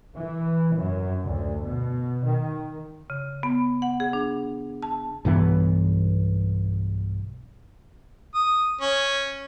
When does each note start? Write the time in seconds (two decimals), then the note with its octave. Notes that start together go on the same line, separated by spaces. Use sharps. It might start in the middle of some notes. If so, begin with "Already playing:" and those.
0.15 E3
0.76 F#2
1.25 D2
1.65 B2
2.26 D#3
3.10 C#3
3.43 B3
3.82 F#5
4.00 G#4
4.13 D4
4.83 A5
5.25 B1 G2 E3 B3
8.35 D#6
8.81 C#4